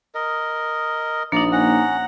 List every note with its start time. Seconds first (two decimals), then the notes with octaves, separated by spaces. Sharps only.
0.15 A#4 D#5
1.32 A#1 A#3 D#4 D5 A#5
1.52 C#4 F#5 A#5